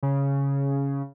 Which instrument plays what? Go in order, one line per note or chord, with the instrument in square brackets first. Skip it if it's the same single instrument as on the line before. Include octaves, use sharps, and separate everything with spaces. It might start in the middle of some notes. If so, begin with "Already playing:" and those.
[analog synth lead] C#3